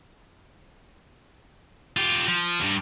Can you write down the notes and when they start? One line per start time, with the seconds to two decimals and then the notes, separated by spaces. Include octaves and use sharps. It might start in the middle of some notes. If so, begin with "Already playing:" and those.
1.97 F4 G4
2.28 F3
2.60 E2 G2